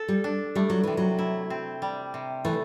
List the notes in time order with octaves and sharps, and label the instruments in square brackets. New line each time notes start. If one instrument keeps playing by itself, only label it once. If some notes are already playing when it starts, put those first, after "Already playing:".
Already playing: [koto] A4
[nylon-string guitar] G3
[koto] D4
[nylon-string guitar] G3 [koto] A3
[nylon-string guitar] F#3
[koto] C3 [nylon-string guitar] E3
[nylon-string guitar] F#3
[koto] E4
C4
G3
C3
[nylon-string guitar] E3 [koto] A3